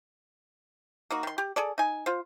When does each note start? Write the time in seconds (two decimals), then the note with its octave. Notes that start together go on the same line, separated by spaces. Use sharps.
1.10 A#3 D#4 F#4
1.23 D#3 C6
1.38 G4
1.56 G#4 A4 D5
1.78 D#4 G#5
2.06 F4 C5